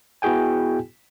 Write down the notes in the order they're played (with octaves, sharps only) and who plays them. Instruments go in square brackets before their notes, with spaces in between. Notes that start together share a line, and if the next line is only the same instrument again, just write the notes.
[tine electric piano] B3 E4 F#4 G#4 G5 G#5